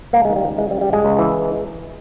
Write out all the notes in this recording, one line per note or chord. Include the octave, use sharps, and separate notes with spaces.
C#2 A#3
G#3
D#3
G3
C#2
E3 G#3
G3
C#3
G3
G1 G#3
C#2
E3